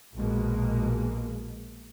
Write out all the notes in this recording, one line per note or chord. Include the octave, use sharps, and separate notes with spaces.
A#1 B2 G#3 A#3